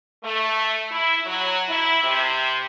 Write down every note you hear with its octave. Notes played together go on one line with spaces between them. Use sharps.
A3
E4
F#3
E4
C3